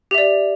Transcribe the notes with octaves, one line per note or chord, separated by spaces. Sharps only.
G4 D5 E5